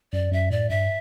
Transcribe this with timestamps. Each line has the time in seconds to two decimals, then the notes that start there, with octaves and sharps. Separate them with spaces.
0.13 F#2 D5
0.32 F#2 E5
0.51 A2 D5
0.70 G2 E5